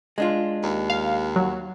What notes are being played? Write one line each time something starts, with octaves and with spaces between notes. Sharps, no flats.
G#3 D4 F4
D#2
F5
F#3